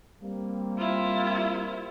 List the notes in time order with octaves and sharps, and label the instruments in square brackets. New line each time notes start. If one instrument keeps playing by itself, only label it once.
[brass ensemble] G3 A#3 C4
[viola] E4 F4